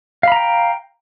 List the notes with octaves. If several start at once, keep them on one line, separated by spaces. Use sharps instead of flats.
F5 G5 A#5 B5